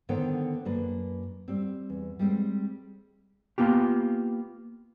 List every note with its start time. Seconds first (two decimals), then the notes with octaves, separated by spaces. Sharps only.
0.09 D3 D#3 B3 C5 C#5 G5
0.65 F#2 A#3 D4 B4
1.48 G3 C4
1.90 E2
2.19 G3 G#3 C4
3.58 A#3 B3 F4 G4